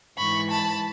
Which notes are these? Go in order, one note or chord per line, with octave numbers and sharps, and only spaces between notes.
G#2 E3 B5 C#6
A5 B5